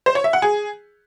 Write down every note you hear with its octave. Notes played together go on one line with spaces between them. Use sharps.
C5
C#5
E5
F#5
G#4